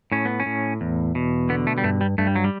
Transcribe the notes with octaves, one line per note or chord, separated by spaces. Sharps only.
A2 C#4
B3
C#4
A2
E2
B2
D3 B3
A3
G3
G2 A3
G3
G2 A3
G3
F#3
G3